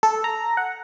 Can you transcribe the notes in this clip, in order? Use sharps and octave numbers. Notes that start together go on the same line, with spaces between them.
A4
A#5
F#5